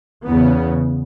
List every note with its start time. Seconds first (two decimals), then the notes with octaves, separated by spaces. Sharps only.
0.27 E2 C#3 B3